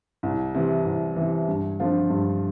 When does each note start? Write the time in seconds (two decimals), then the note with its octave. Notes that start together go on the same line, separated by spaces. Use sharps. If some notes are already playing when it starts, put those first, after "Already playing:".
0.23 C2
0.55 C3 E3
0.85 C2
1.16 C3 E3
1.48 G2
1.80 D3 F3 C4 F4
2.10 G2